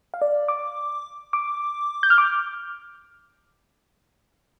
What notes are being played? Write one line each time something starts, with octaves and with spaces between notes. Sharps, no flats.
F5
D5
D6
D6
G6
F6
D6